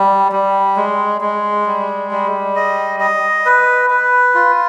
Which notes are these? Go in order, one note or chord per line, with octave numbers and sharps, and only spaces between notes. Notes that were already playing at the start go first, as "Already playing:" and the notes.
Already playing: G3
G3
G#3
G#3
G3
G3
D#5
D#5
B4
B4
F4